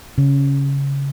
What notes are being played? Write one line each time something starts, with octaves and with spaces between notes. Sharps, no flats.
C#3